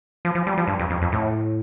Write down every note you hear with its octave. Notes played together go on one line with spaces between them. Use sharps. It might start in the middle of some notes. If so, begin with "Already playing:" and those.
F3
F3
G3
F3
G2
F2
F2
F2
A2